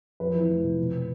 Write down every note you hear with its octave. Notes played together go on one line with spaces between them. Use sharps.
F2 B4
E3
F1
C3
B2